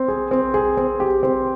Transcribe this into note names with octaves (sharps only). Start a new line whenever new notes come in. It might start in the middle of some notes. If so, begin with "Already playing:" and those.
Already playing: C4
G#4
C4
G#4
C4
G4
C4